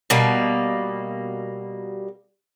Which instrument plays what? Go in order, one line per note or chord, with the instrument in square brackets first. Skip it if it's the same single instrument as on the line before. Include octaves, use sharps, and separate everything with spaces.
[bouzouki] B2 G3 A#3